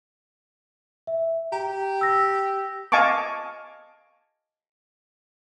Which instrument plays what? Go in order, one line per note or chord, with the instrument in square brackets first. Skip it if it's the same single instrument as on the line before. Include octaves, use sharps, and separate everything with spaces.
[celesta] E5
[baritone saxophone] G4 [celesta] A#5
[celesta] E6 A#6
[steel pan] D#5 F5 G#5 A5 C#6 D6